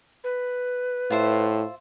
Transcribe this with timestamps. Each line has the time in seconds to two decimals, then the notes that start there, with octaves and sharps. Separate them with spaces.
0.24 B4
1.10 A2 F4 C5 E5